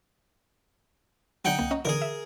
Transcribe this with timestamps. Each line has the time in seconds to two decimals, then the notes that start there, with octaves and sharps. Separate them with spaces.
1.45 D3 F#3 D#4 F#5 G5
1.59 C2 A#3
1.71 C#4 D#5 A#5
1.85 D3 E3 G#4 A#4
2.02 E5